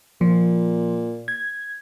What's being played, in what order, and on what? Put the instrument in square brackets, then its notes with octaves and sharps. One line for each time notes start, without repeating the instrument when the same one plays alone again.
[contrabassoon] A#2 [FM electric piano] F3
[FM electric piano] G#6